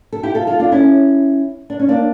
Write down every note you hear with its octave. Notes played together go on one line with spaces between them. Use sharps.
A4
E4 G4
F4 A4
F4 A4
D4 F4
C#4 E4
D4
C#4
A#3 D4